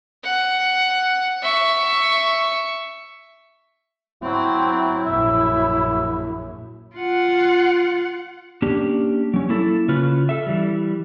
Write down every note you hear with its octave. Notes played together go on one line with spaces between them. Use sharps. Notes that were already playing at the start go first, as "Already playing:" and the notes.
F#5
E5 C#6
F#3 C4 E4
A#1 F#2 E5
F4 F#5
A#3 C#4 D4 G4
F#3 C#4
A#3 E4 A4
C#3 C#4 F4 B4
A4 E5
E3 G3